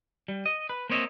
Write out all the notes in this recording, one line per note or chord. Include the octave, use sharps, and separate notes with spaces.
G3
D#5
B4
A#3 C4 C5 C#5 D#5 E5